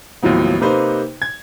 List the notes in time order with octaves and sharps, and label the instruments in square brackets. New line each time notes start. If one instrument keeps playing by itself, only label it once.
[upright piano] D#2 A2 F3 F#3 B3
C3 A#3 D#4 B4 C5
G#6